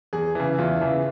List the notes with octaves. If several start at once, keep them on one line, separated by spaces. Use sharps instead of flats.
E2 G#4
C#3 E3
E4
E2 F4
C#3 E3